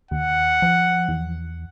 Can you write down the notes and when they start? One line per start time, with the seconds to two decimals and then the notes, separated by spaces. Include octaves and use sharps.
0.11 D#2 F#5
0.62 F3
1.08 E2